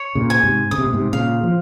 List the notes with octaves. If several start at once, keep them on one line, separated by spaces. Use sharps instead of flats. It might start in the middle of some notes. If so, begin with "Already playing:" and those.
Already playing: C#5
A#2 C#3
G#5
G#2 C3
C#3 D#6
C3
A#2
G#2 C3
A#2 C#3 F5
F3